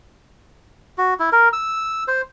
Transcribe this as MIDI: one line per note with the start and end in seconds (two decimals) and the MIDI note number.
0.98 1.14 66
1.19 1.30 64
1.32 1.49 70
1.53 2.04 88
2.08 2.22 72